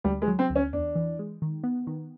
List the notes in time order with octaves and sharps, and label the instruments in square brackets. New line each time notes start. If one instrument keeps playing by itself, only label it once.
[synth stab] D2 [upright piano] G3
[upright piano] G#3
[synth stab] F#3
[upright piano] C4
[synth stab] D2
[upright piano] C#4
[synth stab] E2 [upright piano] D4
[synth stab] E3
G#3
D#3
B3
D#3